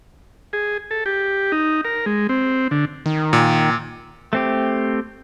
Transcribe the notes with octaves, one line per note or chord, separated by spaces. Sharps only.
G#4
A4
G4
D#4
A#4
G#3
C4
D3
D#3
A#2
A3 C4 G4